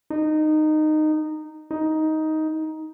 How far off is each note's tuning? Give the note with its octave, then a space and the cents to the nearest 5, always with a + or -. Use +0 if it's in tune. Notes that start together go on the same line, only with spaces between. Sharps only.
D#4 -15
D#4 +10